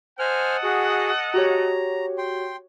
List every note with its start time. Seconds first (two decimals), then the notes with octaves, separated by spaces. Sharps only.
0.19 A4 C5 D#5 F#5 G#5 F6
0.64 F#4 G#4
1.34 F#4 G4 C#5 A#5
2.18 G5 C6